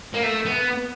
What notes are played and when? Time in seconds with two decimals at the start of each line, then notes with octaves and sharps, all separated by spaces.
0.14 A#3
0.23 A3
0.45 B3